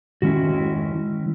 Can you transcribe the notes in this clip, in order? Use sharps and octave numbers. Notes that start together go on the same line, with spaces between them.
D#3 G#3 C#4 E4 F#4